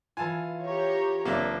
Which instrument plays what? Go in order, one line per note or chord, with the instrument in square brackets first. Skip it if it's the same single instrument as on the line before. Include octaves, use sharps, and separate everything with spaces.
[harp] E3 F4 [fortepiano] G#5 A5
[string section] G4 C#5 A#5
[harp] F#1 C4 A5 [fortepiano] A#3 D4 E5